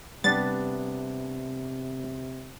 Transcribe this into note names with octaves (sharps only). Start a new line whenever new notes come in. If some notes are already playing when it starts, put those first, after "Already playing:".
C3 G3 B3 D4 B4 A6